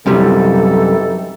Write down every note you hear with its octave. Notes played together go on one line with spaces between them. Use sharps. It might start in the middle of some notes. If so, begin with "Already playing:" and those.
F#2 C3 D#3 E3 G3 A4